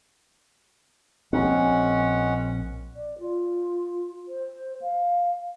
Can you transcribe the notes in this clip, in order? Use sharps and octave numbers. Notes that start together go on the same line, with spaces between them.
A#1 A#2 G#3 C4 C#4 F#5
D5
F4
C5
F5